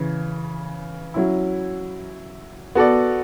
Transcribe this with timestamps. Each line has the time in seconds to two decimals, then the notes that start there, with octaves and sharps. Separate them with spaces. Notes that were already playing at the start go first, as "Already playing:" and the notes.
Already playing: C#3 E3
1.14 F#3 C#4 E4
2.75 B3 F#4 A4 D5